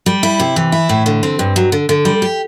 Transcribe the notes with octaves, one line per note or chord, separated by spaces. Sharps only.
G3
E4
C3
E3
E4
A2
D3
C4
G2
F#3
D3
D3
G3
G4